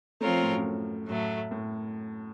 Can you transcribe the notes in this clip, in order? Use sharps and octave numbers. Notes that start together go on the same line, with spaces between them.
F3 A3 C4 F4 A#4 C#5
A2
F#2
A2 F#3 A3
A2